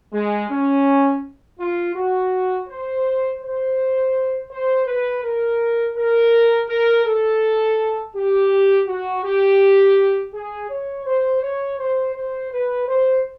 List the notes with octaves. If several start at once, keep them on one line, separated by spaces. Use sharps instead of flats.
G#3
C#4
F4
F#4
C5
C5
C5
B4
A#4
A#4
A#4
A4
G4
F#4
G4
G#4
C#5
C5
C#5
C5
C5
B4
C5